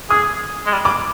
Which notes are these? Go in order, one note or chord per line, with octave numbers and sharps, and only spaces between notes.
G#4 D#6
G#3
G3
G3 D6